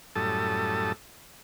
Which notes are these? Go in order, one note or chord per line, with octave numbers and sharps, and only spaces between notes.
F#2 A2 G3 A4 A5 D#6